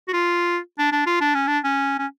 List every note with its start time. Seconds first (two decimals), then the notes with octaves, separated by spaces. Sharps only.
0.08 F#4
0.13 F4
0.78 D4
0.92 D4
1.06 F4
1.21 D4
1.34 C#4
1.47 D4
1.64 C#4
1.99 C#4